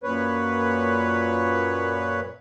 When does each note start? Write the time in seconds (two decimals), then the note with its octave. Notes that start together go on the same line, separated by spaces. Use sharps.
0.03 F#2 A#2 B4 C#5